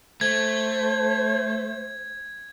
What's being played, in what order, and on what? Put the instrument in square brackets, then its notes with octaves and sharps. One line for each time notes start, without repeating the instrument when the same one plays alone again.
[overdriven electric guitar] A3 [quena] C5 [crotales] G#6